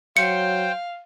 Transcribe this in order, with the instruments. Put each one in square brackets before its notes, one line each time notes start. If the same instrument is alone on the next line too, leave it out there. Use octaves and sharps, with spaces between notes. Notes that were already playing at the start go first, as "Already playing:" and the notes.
[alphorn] F#3 [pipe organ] C5 G5 [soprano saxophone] F5 [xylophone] C#7